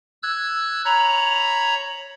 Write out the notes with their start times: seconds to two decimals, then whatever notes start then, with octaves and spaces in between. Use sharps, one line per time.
0.23 E6 F#6 G#6
0.85 C#5 A#5 B5